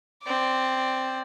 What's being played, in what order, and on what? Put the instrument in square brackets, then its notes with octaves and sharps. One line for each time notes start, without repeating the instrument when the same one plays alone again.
[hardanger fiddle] C4 D5